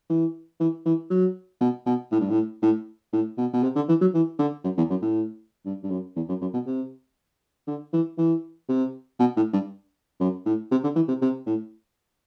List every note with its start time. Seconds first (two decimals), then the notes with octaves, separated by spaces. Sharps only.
0.10 E3
0.60 E3
0.86 E3
1.10 F#3
1.61 B2
1.86 B2
2.12 A2
2.21 G2
2.30 A2
2.63 A2
3.13 A2
3.38 B2
3.53 B2
3.63 C3
3.76 D3
3.89 E3
4.01 F#3
4.14 E3
4.39 D3
4.64 F#2
4.77 E2
4.90 F#2
5.02 A2
5.65 G2
5.84 G2
5.90 F#2
6.16 E2
6.29 F#2
6.41 F#2
6.54 B2
6.67 C3
7.67 D3
7.93 E3
8.18 E3
8.69 C3
9.20 B2
9.37 A2
9.53 G2
10.20 F#2
10.46 A2
10.71 C3
10.84 D3
10.96 E3
11.09 C3
11.22 C3
11.47 A2